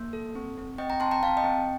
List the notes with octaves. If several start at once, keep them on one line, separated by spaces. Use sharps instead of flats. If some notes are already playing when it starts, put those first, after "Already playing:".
Already playing: A#3
A4
C4
C4
C4 D#5 G5
G5 A#5
C4 A5 C6
G5 A#5
C4 F5 A5
D#5 G5
C4